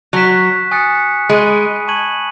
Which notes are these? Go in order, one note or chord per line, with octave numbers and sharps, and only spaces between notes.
F#3 C#6 F#6 B6 E7
G#5 D#6 F#6 A6 C#7
G#3 B5 D#6 A6 D#7
A5 C#6 G#6 D#7 F#7